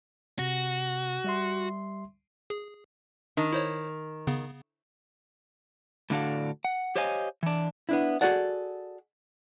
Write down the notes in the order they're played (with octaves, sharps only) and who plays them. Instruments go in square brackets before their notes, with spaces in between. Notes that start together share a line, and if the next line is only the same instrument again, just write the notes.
[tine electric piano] C3 A#6 [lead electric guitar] F#4
[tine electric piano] G3 E5 C6
[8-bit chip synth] G#4
[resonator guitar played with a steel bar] D#3 [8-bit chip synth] D4
[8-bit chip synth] E4 C5 C#5
C#3 B3
[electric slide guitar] A2 D3 D4 F#4 A4 F5
F#5
G4 C5 C#5 D#5 F5 G#5
E3 D4
[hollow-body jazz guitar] B3 D4 E4
F#4 G#4 A4 D5 F#5